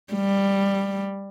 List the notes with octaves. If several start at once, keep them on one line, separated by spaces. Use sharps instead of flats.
G3